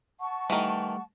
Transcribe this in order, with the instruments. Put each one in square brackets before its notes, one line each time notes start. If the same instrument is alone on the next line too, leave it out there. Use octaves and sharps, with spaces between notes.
[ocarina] F#5 [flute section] A5 C#6
[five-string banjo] D#3 E3 [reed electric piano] G3 A3